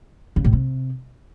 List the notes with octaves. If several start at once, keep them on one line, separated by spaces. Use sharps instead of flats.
C#3
A2
C3